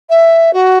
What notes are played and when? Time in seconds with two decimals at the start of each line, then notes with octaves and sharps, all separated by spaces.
0.09 E5
0.53 F#4